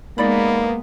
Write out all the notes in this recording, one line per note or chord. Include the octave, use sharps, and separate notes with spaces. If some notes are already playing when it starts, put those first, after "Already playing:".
G#3 A#3 B3 D#4 D5 B5